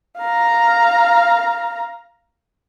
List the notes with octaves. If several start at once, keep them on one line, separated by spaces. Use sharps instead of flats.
F5 A#5